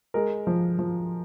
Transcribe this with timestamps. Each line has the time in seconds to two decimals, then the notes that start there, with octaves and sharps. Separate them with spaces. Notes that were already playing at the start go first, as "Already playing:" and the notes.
0.14 G#3 A#4
0.47 F3
0.79 F3